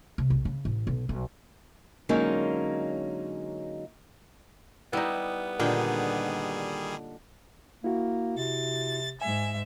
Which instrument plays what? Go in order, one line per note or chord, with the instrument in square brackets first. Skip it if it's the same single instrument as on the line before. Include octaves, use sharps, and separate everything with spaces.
[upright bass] C3
B1
C#3
A1
B1
B1
[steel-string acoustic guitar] D3 F#3 G#3 A#3 C#4 D#4
[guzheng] G3 [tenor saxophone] B3 [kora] D#4 E4
[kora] A#2 [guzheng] D3 D#4 G5 [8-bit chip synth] D#3 G3 G#4
[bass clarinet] A#3 [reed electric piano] E4 F#4
[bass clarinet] C3 [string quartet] A6
[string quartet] G#2 E5 [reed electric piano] G#5